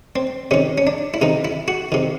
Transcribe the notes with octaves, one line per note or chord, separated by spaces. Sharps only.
C4
C3 D#3 C#4
C#4
D4
E4
C3 D#3 D#4
E4
F#4
C3 D#3